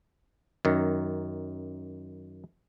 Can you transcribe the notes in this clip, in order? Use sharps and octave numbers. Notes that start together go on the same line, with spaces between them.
F#2 D#3